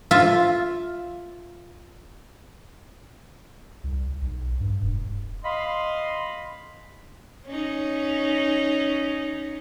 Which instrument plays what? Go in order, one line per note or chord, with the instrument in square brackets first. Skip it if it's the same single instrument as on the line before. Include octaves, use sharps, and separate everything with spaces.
[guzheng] F4 E5
[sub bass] C2
B1
G2
E1
[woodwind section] D#5 F5 B5 C6
[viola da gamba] C#4 D#4